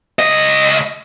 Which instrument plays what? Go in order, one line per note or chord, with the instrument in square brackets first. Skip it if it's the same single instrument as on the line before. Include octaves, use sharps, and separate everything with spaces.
[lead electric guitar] C#2 D#5